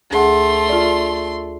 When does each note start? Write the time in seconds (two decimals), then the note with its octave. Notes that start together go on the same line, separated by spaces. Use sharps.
0.11 D2 A3 G#4 F#5 C6
0.69 F4 D5